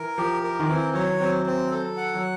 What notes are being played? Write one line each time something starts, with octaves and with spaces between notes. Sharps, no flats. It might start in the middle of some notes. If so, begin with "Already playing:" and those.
Already playing: E3 A#4
F3 G4
A#4
D#3
E3 C4
F#3 C#5
F#3 C4
C4
A4
F#5
F#3